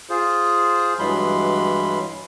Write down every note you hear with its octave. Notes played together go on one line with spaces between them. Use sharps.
F4 G#4 C5
G2 E3 F#3 G#3 B5 C6